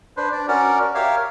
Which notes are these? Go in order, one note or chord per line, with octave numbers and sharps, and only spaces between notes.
D4 B4 C5
D4 D5
C#4 F#4 A#4 D5
G4 A#4 C#5 E5 F5